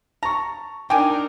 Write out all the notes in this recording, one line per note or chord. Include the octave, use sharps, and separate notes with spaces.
A5 A#5 C#6
D4 D#4 A#4 G5 G#5 D6